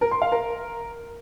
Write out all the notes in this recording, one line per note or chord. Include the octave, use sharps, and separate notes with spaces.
A#4
C6
F5
A#4